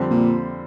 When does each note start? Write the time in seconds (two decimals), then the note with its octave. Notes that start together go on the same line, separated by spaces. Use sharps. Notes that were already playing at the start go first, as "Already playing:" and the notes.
Already playing: F2 D3 G3 C4
0.11 A#2